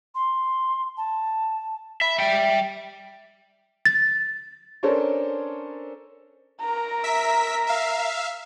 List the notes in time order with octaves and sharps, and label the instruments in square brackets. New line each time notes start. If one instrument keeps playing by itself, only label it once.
[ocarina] C6
A5
[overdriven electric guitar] E5 [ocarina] B5
[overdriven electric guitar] G3 G5 [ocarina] E5
[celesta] A6
[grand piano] C#4 D4 A4 A#4 C5 C#5
[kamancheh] A#4 A#5
[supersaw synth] E5 B6
E5 F5